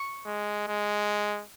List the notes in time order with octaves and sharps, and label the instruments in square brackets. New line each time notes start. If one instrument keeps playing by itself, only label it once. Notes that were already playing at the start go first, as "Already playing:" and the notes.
Already playing: [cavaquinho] C#6
[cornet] G#3
G#3